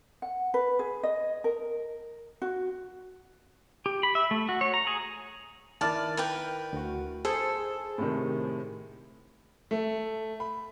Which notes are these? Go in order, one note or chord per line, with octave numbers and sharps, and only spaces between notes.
F#5
B4
G#4
D#5
A#4
F#4
G4
B5
E5
A3
F#4
C#5
A#5
G#4
D#3 E4 B4 D5 A5 F6
A#4 B4 G5
D2 F#4
G#4 A4 C5 A5
A2 C3 D#3
A3
B5